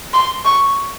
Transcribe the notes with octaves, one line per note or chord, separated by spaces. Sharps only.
C6
C#6